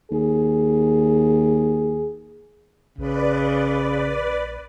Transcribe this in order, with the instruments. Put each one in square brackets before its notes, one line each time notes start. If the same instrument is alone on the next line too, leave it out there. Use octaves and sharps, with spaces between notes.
[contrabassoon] D#2 [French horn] G#4
[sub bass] A#1 [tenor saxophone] C#3 [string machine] B4 D5